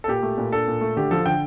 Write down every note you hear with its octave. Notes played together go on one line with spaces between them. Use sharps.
A4
A#2 G4
A3
A#2
D4 A4
A#2
A3
D3 G4
F3 A4
D3 G5